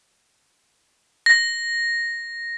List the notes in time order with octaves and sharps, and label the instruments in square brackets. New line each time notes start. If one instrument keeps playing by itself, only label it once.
[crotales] A#6